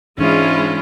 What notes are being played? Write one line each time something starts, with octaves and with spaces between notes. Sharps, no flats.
G#2 E3 G#3 C#4 D4 E4 F4